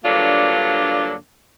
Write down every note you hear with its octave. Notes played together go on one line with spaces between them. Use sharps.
G2 D3 F#3 A#3 D4 F4